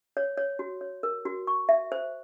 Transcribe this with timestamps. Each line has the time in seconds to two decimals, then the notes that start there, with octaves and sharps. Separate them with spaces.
0.17 C#5
0.37 C#5
0.59 F#4
0.81 C#5
1.03 A#4
1.25 F#4
1.47 C#6
1.69 E5
1.92 C5